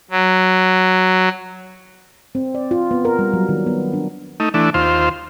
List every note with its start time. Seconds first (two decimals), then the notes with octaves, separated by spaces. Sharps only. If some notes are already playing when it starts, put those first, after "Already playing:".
0.11 F#3
2.35 C4
2.55 D5
2.71 F4
2.91 B3
3.05 A#4
3.19 G3
3.33 F#3
3.49 D#3
3.66 B3
3.93 D4
4.40 A3 D#4
4.54 E3 A3 D4
4.74 D#2 F4 C5